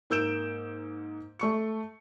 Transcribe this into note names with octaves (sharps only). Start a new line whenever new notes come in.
G#2 A#3 E6 G6 D7 E7
A3 C#6 C#7